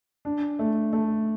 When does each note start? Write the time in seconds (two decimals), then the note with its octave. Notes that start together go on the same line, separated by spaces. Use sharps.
0.25 D4
0.59 A3
0.93 A3